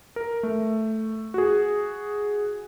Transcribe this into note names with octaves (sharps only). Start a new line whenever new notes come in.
A#4
A3
F#4 G#4